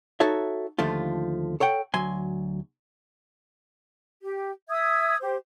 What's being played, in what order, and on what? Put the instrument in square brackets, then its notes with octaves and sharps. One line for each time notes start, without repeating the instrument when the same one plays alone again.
[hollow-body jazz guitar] D#4 F#4 A4 C#5 E5
D#2 D3 F3 A3 F4
A4 C#5 F#5 G5
D2 F#3 G#5 C6
[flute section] G4
E5 D#6 E6 G#6
G4 C5